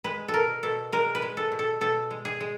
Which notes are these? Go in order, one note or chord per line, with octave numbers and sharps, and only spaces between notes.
G#3 B4
A4
B2 A#4
B2 A4
G#3 A#4
B4
G#3
A4
B2
A4
B2 A4
G#3
G#4
G#3